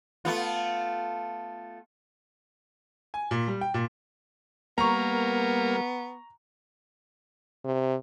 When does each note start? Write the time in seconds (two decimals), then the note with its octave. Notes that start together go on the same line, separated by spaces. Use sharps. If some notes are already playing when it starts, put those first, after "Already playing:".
0.25 A3 B3 F4
3.14 G#5
3.31 A#2
3.48 G3
3.61 G5
3.74 A#2
4.78 G3 A#3 B3 A#4 A#5 C#6
7.65 C3